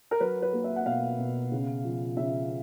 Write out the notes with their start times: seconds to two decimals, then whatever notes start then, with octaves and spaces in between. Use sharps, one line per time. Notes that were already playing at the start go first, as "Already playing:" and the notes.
0.11 A#4
0.20 F#3 B4
0.42 B4
0.53 A#3
0.64 E5
0.76 F#5
0.86 B2 F5
1.19 B2
1.52 C#3
1.84 F3
2.17 C#3 E5